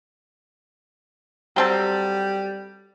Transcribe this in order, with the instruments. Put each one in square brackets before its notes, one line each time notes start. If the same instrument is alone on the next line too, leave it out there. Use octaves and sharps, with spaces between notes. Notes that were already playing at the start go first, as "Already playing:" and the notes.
[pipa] F#3 C4 A4 [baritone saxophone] G3